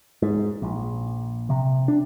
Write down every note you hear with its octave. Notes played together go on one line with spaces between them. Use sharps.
G#2
A#1
C3
D4